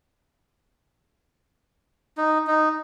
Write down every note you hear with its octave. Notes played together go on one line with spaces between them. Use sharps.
D#4
D#4